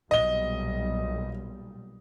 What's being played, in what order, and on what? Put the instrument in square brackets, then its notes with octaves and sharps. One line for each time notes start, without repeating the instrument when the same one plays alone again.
[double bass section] B1 A#2 G3 [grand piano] D#5 G7